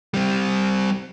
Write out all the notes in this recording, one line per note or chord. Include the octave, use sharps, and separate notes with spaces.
G3 C4